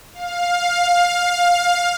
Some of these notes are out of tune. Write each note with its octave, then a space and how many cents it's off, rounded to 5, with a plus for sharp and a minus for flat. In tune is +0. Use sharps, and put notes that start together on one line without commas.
F5 +15